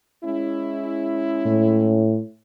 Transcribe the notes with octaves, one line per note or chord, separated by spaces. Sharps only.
G#3 C#4 E4
A2